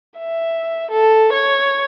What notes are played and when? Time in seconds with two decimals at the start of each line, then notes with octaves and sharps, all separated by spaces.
0.18 E5
0.91 A4
1.33 C#5